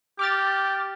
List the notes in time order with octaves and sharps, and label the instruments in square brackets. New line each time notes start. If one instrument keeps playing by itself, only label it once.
[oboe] G4 [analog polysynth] D6 F6 A6